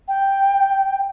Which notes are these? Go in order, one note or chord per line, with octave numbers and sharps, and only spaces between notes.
G5